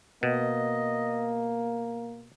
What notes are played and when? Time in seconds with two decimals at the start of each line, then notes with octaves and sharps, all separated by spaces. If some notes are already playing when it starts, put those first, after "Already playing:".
0.23 B2 A#3 D#5